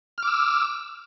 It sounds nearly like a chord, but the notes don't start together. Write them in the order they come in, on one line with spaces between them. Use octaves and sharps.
F6 D6 E6